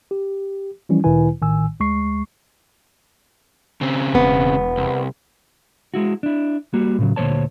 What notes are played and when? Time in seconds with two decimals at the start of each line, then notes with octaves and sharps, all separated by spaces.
0.11 G4
0.89 E3 F3 G3 C#4 E4
1.04 D2 A#2 D#3 E4 B4 G#5
1.42 A1 A2 D#3 G#5 E6
1.80 D2 G#3 C#6 C7
3.81 C#3 C4
4.15 E1 B3
4.77 C2
5.94 G#3 E4 F#4
6.23 D4 E4
6.74 G3 A#3 F#4
6.99 A2 C#3 F#3
7.16 D2 A#2 D#3 C5 C#5 A5